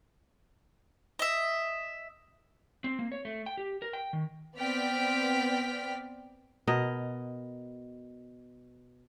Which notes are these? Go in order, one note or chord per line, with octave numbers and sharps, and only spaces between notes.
D#5 E5
C4
A#3
C#5
A3
G5
G4
A#4
G5
D#3
B3 C4 D5 G5 F6 B6
B2 A#4 D#5